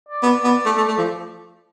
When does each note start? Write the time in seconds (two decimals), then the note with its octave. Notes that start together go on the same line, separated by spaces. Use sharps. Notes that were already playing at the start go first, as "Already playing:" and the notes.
0.09 D5
0.23 B3
0.44 B3
0.66 A3
0.77 A3
0.88 A3
0.98 F3